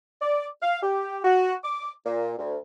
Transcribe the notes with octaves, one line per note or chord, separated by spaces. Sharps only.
D5
F5
G4
F#4
D6
A#2
D2